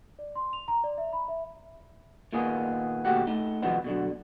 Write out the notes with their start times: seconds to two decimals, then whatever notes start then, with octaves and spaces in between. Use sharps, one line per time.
0.19 D5
0.36 C6
0.53 F7
0.68 A#5
0.84 D5
0.98 E5
1.13 B5
1.28 E5
2.33 A#2 D#3 A#3 B3 G#4
3.05 D#2 B2 A3 F#4 G4 F#5
3.27 A3 D#4
3.62 C3 D#3 F3 F#3 G#3 B3
3.84 B2 D3 F#3